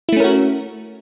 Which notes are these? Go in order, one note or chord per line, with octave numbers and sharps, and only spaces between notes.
A3 C#4 E4 F#4 A#4